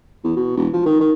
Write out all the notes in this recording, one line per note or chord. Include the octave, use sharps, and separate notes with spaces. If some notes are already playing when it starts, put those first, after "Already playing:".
E2
B2
E1
F3
D#3
D#3